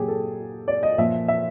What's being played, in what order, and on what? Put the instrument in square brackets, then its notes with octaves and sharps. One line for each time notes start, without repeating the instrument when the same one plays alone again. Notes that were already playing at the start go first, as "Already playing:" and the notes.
Already playing: [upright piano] A#2 F#3 G4 G#4
A4
D5
D#5
A#2 F3 E5
E5